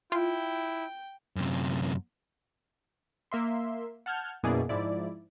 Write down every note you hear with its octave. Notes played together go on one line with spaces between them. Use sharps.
E4 F4 G5
F#2 C3
A#3 E5 C6
F#5 A5 F6 G6 G#6
F#2 B2 A#3 E4 G#4 D5
G#2 F3 E4 D5